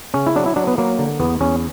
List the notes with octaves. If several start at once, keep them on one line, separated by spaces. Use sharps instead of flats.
C#3 C#4
E4
F#3 D4
E4
F#3 D4
B3
F#3 A#3
D3
E2 B3
E2 C#4